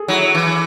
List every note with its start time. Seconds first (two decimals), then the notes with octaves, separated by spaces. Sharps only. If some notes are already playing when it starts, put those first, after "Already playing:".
Already playing: G#4 A4
0.08 F#3 E4
0.35 E3